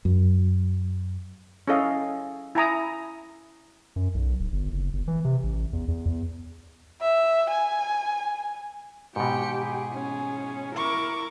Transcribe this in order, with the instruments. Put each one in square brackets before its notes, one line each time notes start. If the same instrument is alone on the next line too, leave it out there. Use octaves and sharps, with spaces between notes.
[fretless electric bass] F#2
[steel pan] C#4 E4 G#4 A4 D#5 F5
E4 G#5 A#5 D#6
[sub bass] F#2
B1
D1
G1
F#1
G1
E3
C3
A1
E2
E2
E2
[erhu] E5
G#5
[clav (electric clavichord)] G#2 B2 [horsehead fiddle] G4 [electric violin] G5 C#7
[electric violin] G#4
[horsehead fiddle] C#4
[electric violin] E4 D6 [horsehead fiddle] A#4 [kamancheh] C#6